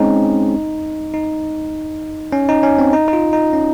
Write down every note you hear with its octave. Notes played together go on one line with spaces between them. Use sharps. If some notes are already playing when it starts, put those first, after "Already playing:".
Already playing: G#3 C4 C#4 D#4
D#4
C#4
D#4
C#4
C4
D#4
D#4
F4
D#4
C#4